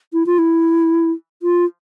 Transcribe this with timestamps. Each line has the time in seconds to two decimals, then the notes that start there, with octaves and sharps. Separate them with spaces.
0.13 E4
0.26 F4
0.38 E4
1.42 F4